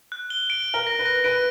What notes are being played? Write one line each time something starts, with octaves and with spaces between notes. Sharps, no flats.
F#6
G7
D7
G7
A#4
A#6
B4
A#6
B4 D7